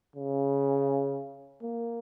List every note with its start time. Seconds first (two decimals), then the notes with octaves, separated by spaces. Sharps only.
0.16 C#3
1.63 A#3